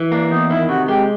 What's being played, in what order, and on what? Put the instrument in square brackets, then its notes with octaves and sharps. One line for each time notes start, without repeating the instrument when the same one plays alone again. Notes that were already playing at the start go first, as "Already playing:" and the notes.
Already playing: [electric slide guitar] E3
[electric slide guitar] A#3 [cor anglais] D4
[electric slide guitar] E2 [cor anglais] D#4
[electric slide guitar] D#3 [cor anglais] E4
[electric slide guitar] C3 [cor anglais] F#4
[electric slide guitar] G#3 [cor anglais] G4